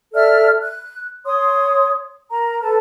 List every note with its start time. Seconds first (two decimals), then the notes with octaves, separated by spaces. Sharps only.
0.14 A4 D5 E5 F6
0.62 F#6
1.25 C#5 C6 D#6
2.30 A#4 A#5
2.62 A4 B4 A5